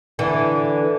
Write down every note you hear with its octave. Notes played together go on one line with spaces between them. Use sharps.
D3 E3